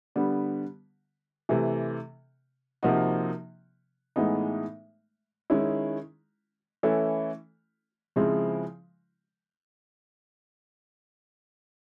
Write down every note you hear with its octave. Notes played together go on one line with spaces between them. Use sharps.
D3 G3 B3
C3 E3 A3
C3 F3 A#3 D#4 F#4
A2 E3 G#3 B3 D#4
D#3 G#3 C#4 E4
E3 A3 C#4 E4 A4
C#3 F3 G#3 C4 E4